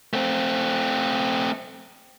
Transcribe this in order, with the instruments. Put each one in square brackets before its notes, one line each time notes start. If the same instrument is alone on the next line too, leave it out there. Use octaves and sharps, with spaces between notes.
[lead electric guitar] A3 C4